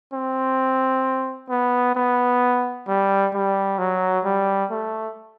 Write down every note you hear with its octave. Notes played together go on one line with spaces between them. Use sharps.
C4
B3
B3
G3
G3
F#3
G3
A3